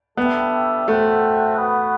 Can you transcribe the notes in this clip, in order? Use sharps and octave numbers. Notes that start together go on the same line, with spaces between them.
G3 B3 D4 A4 E5 G5
A3 F#4 A4 C5 E5 G5
B3 F#4 B4 F#5